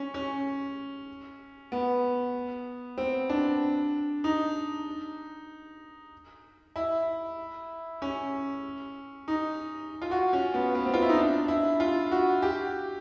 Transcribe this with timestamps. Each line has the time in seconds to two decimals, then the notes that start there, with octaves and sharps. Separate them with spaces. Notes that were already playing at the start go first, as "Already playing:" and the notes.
Already playing: C#4
0.14 C#4
1.72 B3
2.98 C4
3.29 D4
4.24 D#4
6.76 E4
8.02 C#4
9.28 D#4
10.02 F4
10.11 F#4
10.33 C#4
10.54 B3
10.75 B3
10.85 C4
10.94 F4
11.02 E4
11.09 D#4
11.17 D4
11.48 E4
11.80 F4
12.11 F#4
12.42 G4